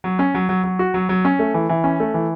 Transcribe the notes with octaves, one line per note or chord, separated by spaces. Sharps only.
F#3
C#4
F#3
F#3
F#3
F#4
F#3
F#3
C#4
A3
E3
E3
C#4
A3
E3